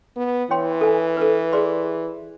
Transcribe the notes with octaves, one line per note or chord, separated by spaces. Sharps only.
B3
E3 C#5 G5 C6
A4 G#5
A4 B4
G#4 D5 C6